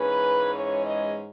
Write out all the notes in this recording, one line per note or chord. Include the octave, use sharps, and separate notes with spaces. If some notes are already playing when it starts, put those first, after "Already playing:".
Already playing: G#2 E3 G#3 C#4 B4
C#5
D#5